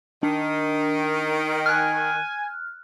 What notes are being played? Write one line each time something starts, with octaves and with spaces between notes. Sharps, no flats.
D#3 D4
G#5 F6 F#6